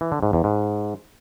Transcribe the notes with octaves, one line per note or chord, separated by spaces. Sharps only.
E3
D3
G#2
E2
G#2